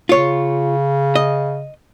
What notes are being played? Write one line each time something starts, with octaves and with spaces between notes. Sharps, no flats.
C#3 F4 C#5
D#5